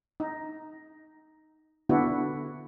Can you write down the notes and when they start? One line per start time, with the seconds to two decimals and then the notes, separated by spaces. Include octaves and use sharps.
0.20 D#4
1.89 D3 B3 D4 E4 F#4